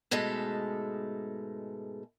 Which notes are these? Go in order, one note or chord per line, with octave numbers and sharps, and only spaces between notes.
G#2 B2 G#3 A3 A4